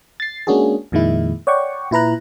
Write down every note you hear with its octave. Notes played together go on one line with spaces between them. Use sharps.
A6 C7
G#3 A#3 C#4 D4 F#4 G#4
F2 A#2 D#3 G#3 E4
C#5 D5 F#5 G5 C#6
A#2 E4 B4 A#5 F#6